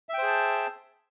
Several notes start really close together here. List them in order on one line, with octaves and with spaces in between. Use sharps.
E5 G5 C5 G#4 A5